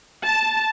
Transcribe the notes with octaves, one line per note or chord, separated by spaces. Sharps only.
A5